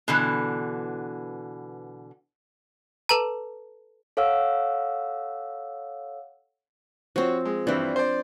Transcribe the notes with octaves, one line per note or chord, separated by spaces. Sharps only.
B2 D3 E3
A4 B4 A5 A#5
A4 C#5 F5 F#5 E6
F3 C4 F#4 C#5
G#3
G2 E3 C4 D4
C5 D5